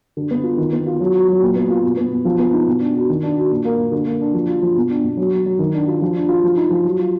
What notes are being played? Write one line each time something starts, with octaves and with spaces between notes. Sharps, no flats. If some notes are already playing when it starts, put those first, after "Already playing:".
D3
B3
F4
D#3
B3
F4
F#3
F#4
F#3
A#2
B3
F4
B2
B3
B2
F3
B3
D#4
B2
D4
F#4
D#3
D4
F#4
A#2
A#3
A#2
D3
A#3
D4
F3
F4
F3
B2
D4
B2
F#3
F#4
F#3
D#3
D4
F4
F3
D4
F4
F3
D#4
F3
F#3
F4